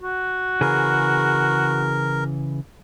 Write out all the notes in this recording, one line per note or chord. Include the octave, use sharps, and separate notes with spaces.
F#4
C#3 E3 G#4 A#4